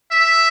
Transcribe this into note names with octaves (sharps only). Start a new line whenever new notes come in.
E5